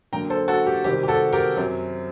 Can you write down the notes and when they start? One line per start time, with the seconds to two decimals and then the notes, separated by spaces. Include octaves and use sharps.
0.13 D3 F#3 A#3 G5 A#5
0.30 A4 C5
0.48 F#4 A4
0.66 G4
0.84 C3 D#3 G3 C4 G4
1.03 G4
1.08 F#4 A4
1.33 G4 A#4
1.57 F#2 F#3 C4